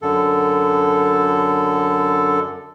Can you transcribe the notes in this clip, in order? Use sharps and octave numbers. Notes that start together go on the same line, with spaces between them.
F#2 D3 A4